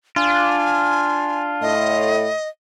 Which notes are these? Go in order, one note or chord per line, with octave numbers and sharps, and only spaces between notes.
D4 F4 G#5
A2 D#5